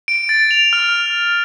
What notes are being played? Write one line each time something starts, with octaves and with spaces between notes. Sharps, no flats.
D7
A6
F7
F6